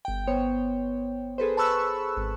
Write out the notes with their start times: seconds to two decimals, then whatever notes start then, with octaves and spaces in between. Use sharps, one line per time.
0.05 G1 G5
0.27 B3 C5 C#5
1.38 G#4 A4 B4 C5
1.57 A5 B5 C#6 E6 F#6
2.17 G#1